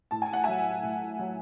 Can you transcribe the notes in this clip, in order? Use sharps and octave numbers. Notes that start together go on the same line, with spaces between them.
A2 A5
G#5
F#5
F#3 E5 G#5
A2
F#3